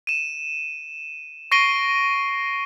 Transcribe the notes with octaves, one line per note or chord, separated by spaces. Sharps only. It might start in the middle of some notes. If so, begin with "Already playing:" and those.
D#7 E7
C#6 A#6 C7 D7 D#7 G7